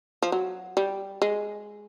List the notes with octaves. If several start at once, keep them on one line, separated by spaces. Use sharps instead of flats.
F3
F#3
G3
G#3